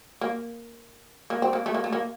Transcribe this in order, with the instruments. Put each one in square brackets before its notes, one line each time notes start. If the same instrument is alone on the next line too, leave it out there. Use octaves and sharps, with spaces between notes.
[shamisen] A#3
A#3
C4
A#3
A3
A#3
A3
A#3